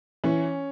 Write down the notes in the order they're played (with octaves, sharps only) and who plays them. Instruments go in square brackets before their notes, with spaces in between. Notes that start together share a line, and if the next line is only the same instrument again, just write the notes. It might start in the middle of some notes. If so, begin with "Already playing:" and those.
[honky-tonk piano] E3 [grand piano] C#4